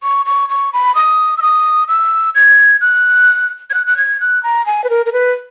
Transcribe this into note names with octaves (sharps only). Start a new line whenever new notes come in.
C#6
C#6
C#6
B5
D#6
E6
D#6
E6
G#6
F#6
G#6
F#6
F#6
G#6
F#6
A#5
G#5
B4
A#4
A#4
B4